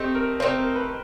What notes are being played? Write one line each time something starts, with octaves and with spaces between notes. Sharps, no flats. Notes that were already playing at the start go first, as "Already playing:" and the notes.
Already playing: A3 C4 D#4 G4
A#4
A3 C4 D#4 C5
A#4
B4